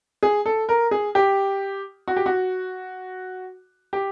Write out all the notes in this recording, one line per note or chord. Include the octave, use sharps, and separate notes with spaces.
G#4
A4
A#4
G#4
G4
F#4
G4
F#4
G4